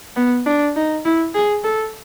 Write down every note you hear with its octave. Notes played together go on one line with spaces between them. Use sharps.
B3
D4
D#4
E4
G#4
A4